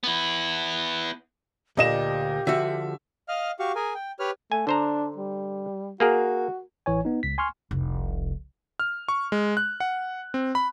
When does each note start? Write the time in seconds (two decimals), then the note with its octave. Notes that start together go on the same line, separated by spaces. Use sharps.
0.03 B3 E4
1.77 D2 A#2 D4 G4 D#5 E7
2.47 D3 F3 F#4 E5
3.28 D#5 F5 F6
3.59 F#4 G4 F5 C#6
3.75 G#4 A#4 G#5
3.95 G5
4.19 G4 B4 C#5 F6
4.52 A3 G#5
4.67 D3 D4 C5 A#5
5.16 G3
6.00 A#3 F#4 G#4 A#4
6.86 A1 E3 C#5 G#5
7.05 B3 D#4
7.23 C#2 B6
7.38 G#5 C6 C#6 F6
7.71 F1 C2
8.80 F6
9.08 C#6
9.32 G#3
9.57 F#6
9.80 F#5
10.34 C4
10.55 B5